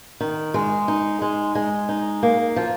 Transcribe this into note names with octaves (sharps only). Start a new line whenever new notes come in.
D#3
G#3
D#4
G#3
G#3
D#4
A#3
F3